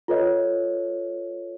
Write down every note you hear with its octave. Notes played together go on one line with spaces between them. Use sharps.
F4 A4 B4 C#5 D#5